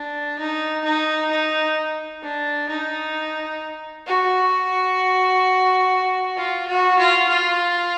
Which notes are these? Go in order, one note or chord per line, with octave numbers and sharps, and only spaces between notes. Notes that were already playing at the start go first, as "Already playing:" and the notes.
Already playing: D4
D#4
D#4
D#4
D4
D#4
F#4
F4
F#4
F4
F4